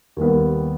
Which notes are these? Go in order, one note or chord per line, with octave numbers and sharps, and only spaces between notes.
D#2 D#3 G3 B3